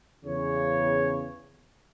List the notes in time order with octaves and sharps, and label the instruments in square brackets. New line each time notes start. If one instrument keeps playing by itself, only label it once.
[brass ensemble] E2 C#3 C#5